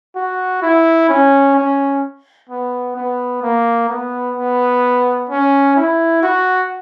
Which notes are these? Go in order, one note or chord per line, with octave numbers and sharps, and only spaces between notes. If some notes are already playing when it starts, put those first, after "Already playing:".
F#4
E4
C#4
C#4
B3
B3
A#3
B3
B3
C#4
E4
F#4